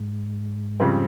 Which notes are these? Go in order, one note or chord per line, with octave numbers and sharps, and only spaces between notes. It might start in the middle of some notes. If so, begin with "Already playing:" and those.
Already playing: G#2
F2 C#3 G3 C4